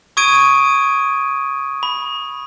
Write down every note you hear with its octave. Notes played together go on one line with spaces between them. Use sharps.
C#6 D#6 G#6 D7 D#7
B5